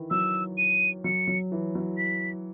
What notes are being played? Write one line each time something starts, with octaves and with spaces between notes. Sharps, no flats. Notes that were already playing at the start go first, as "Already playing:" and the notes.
Already playing: D#3 E3
F#3 E6
D#7
F#3 C#7
F#3
E3
F#3
B6